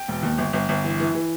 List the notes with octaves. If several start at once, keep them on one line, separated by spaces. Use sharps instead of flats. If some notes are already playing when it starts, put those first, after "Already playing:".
Already playing: G5
E1
D#2
G1
G1
G1
E3
E3
E3